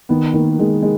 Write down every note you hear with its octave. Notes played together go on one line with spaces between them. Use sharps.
D#3 B3
D#3 A#3
D#3 G#3
G#3